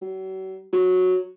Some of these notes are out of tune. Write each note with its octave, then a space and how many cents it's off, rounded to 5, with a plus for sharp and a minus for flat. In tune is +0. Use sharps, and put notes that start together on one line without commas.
F#3 +40
F#3 -10